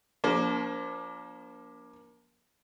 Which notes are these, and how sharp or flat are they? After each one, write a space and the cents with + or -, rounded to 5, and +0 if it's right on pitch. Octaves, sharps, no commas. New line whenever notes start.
F3 +0 A#3 +25 D4 -40